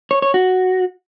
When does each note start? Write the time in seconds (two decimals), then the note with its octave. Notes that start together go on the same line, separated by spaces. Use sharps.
0.11 C#5
0.22 C#5
0.34 F#4